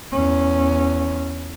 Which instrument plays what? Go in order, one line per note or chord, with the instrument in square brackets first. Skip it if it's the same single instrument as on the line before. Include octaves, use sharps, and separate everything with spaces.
[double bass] E2 C#4